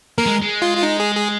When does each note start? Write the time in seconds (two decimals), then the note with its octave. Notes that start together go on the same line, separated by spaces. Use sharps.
0.18 A#3 A#4
0.26 G#3
0.42 G#3
0.62 F4
0.77 F4
0.83 D#4
1.00 G#4
1.15 G#4